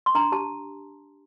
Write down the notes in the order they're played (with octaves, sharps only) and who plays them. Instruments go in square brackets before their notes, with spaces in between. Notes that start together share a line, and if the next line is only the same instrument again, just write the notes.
[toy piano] C6
D4 A#5
G4 A5